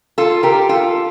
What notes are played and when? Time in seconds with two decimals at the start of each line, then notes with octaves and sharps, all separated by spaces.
0.18 F4 A4
0.43 G4 A#4
0.69 F4 A4